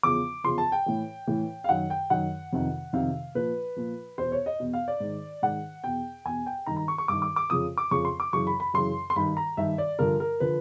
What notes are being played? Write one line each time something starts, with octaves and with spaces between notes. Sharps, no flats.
E2 C#3 F3 D6
E2 C#3 F3 C6
A5
G5
A2 E3
A2 E3
F5
F#2 D#3 F#5
G5
F#2 D#3 F#5
F2 C3 D#3
F2 C3 D#3 F5
A#2 F3 B4
A#2 F3
E2 B2 C5
C#5
D#5
E2 B2
F5
D5
G#2 D#3
G#2 D#3 F#5
E2 B2 G5
E2 B2 G#5
G5
G2 D#3 A#5
A#5
C#6
C#6
G2 D#3 D6
D6
D6
F2 C#3 F3 D#6
D6
F2 C#3 F3 C#6
C6
D6
F#2 C#3 E3 C#6
B5
B5
F#2 C#3 E3 C6
C6
G2 D#3 B5
A#5
G2 D#3 E5
D5
G2 D3 F3 A#4
A#4
D3 F3 B4